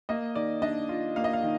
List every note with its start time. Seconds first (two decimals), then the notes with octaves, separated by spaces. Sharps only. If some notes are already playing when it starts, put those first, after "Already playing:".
0.09 A#3 D#5
0.35 D#3 D5
0.62 D4 D#5
0.89 F4
1.16 A#3 F5
1.24 D#5
1.33 F5
1.43 D#3